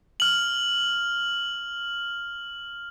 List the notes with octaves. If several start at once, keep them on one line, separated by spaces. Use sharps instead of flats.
F6 F#7